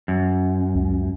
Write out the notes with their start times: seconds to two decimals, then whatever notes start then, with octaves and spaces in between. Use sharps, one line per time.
0.08 F#2
0.75 C#2